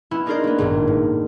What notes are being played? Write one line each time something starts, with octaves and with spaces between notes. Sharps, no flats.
B3 C#4 E4
D4 D#4 G#4 A#4 C5 D5
A#3 B3
G#1 C#2 G2 A#2
A2